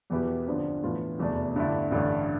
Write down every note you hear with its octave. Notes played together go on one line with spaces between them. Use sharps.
E2 B2 B3 E4 G4
G1 G2 D3 F3 C4
A2 E3 B3 F4
F1 E2 B2 A3 D4
G1 G2 D3 A3 E4
A1 G2 D3 A3